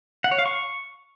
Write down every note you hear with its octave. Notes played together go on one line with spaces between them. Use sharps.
F#5
C#5
F5
C#6